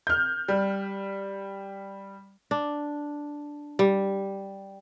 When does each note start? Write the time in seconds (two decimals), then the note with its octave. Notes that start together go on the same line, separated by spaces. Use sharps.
0.07 F6 G6
0.48 G3
2.51 D4
3.79 G3